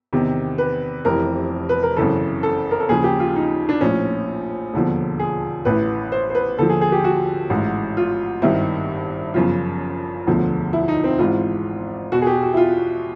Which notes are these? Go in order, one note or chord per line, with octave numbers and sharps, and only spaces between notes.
E2 C3 D#3
B4
F1 F2 C3 E3 A#4
B4
A#4
G#1 F#2 C#3 E3 A4
A4
A#4
A4
D#2 C#3 F3 G#4
G4
F4
D#4
D4
A#1 A2 F3 C#4
E1 D#2 D3 F3
G#4
A1 A2 E3 B4
C5
C5
B4
D#2 D3 F3 A4
G#4
G#4
G4
F#4
A1 G#2 E3
F4
G#1 G2 D#3 E4
G1 F#2 C#3 F3 F4
E1 D2 D3 F3
E4
D#4
C4
G#1 G#2 E3 F4
E2 B2 F#4
G#4
G4
F#4
E4
F4